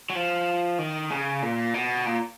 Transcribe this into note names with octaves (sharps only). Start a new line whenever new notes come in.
F#3
F3
D#3
C#3
A#2
B2
A#2